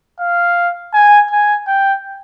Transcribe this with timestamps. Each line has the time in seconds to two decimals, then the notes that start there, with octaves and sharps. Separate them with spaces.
0.20 F5
0.94 G#5
1.31 G#5
1.68 G5